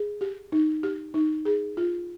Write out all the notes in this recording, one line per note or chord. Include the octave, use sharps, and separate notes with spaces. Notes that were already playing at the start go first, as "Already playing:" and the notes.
Already playing: G#4
G4
D#4
G4
D#4
G#4
F4